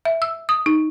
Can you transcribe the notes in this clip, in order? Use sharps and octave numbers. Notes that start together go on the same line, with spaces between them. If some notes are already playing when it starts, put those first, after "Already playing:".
E5
E6
D#6
D#4